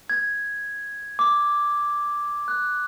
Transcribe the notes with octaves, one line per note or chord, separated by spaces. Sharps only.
G#6
D6
F#6